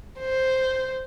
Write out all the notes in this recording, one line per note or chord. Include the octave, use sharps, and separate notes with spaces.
C5